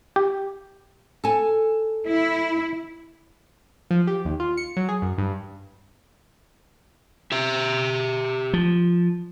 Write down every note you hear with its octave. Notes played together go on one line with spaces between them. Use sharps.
G4
A4 G#5
E4
F3
G4
D#2
F4
C#7
F#3
G#4
F#2
G2
G4 E5
F3